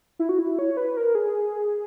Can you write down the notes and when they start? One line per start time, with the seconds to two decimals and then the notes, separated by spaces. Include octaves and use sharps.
0.19 E4
0.29 F#4
0.39 E4
0.59 C#5
0.77 B4
0.97 A#4
1.15 G#4